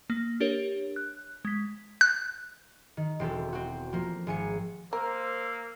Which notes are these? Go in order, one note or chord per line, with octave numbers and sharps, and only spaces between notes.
A#3
D4 G4 A#4 C#5
F#6
G#3 B6
F#6
D#3
E1 C4 C#4 A4
C4 F#4
F3 A#3
G#1 G#5 C#7
A#3 A#4 C5 E6